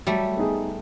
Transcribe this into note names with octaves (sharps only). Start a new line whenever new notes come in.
F#3 G3 A3
B3 D#4 G#4